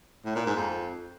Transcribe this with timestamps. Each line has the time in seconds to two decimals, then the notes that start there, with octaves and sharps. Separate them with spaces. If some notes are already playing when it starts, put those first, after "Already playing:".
0.25 A2
0.35 A#2
0.46 G#2
0.56 F2